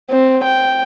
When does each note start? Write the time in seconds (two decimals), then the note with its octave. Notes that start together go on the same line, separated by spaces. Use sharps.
0.10 C4
0.44 G5